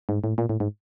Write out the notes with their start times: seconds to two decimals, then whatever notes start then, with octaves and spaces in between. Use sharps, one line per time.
0.09 G#2
0.24 A2
0.38 A#2
0.49 A2
0.60 G#2